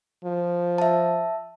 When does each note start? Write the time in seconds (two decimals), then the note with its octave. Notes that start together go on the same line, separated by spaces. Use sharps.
0.24 F3
0.78 E5 A5